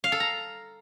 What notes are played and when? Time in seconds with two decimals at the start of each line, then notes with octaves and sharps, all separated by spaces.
0.04 F5
0.12 A4
0.20 A#5